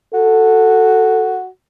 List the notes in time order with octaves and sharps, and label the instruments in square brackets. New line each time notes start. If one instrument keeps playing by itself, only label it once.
[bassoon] F#4 [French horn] A4